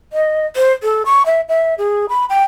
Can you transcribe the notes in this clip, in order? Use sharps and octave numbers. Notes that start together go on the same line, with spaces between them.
D#5
C5
A4
C#6
E5
E5
G#4
B5
G5